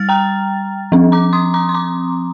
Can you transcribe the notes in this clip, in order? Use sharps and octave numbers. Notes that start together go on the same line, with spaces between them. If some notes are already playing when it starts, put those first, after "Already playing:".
Already playing: G3 F6 A6
G5 A#5
F3 C4
A#5 D6
C6 D#6
A#5 D6
C6
A#5 D6